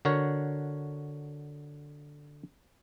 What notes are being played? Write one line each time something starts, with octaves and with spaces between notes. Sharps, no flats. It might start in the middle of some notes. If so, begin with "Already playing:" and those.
D3 F#4 A#4 C#5